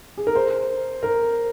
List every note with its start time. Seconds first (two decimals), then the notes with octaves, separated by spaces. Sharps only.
0.17 G#4
0.27 A#4
0.35 C5
1.03 A#4